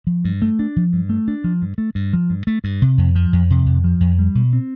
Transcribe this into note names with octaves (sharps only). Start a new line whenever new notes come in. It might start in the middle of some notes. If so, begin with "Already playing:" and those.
F3
G2
A3
D4
F3
G2
A3
D4
F3
G2
A3
G2
F3
G2
A3
G2
C3
F2
F3
F2
C3
F2
F3
F2
G3
B2
C4